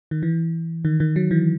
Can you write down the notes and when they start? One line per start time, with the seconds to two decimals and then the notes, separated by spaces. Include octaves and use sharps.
0.11 D#3
0.23 E3
0.85 D#3
1.00 D#3
1.16 F#3
1.31 E3